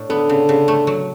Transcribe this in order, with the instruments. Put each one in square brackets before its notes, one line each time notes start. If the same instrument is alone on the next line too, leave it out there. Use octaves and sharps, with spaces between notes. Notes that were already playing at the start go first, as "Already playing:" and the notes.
Already playing: [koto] A2 D4
[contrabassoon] D3 [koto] B3
[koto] C#3
C#3
A3
F#3